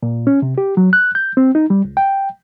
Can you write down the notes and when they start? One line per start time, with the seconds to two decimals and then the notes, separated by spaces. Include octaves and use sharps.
0.03 A#2
0.27 C#4
0.42 C3
0.58 G4
0.77 F#3
0.93 F#6
1.15 G6
1.37 C4
1.55 D#4
1.70 G3
1.85 C#2
1.97 G5